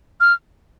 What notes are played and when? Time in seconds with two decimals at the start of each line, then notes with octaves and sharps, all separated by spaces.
0.20 F6